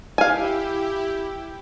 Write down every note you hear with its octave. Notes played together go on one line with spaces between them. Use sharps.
E4 G4 F5 G#5